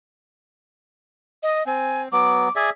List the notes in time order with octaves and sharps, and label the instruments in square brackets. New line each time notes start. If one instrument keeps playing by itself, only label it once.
[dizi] D#5
[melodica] C4 [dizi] G#5
[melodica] F#3 B3 [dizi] D6
[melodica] G#4 D5 E5